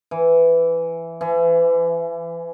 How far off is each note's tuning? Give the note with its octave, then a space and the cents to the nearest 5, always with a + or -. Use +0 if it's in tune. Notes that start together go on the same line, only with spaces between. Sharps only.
E3 +10
E3 +35